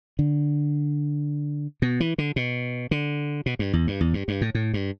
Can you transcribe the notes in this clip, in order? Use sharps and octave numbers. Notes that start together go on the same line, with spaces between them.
D3
B2
E3
D3
B2
D3
B2
G2
E2
G2
E2
G2
G2
A2
A2
G2